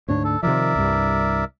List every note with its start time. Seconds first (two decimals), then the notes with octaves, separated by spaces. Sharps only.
0.08 D2 G#2 D4 C#5
0.24 A4
0.43 C3 D#3 F3 A#4 D5 E5
0.76 C2 G2